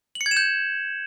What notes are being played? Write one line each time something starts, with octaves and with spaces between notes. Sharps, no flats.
F#7
C#7
G#6
E7
G6